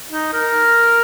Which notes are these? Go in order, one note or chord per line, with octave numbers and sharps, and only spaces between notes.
D#4
A#4